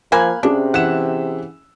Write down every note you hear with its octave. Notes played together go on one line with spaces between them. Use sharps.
F3 A#3 F5 G#5 B5 F#6
C3 C#4 D4 G#4
E3 E5 F#5 E7